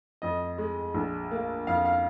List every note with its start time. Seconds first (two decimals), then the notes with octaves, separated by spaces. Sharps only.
0.22 F2 D#5
0.58 G#3
0.94 A#1
1.31 A#3
1.67 F2 F5
1.85 F5